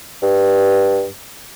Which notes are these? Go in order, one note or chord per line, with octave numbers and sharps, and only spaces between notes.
G2